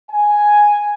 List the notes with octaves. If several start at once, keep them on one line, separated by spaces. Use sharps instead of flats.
G#5